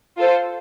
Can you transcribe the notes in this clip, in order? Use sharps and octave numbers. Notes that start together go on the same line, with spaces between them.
F4 A4 C5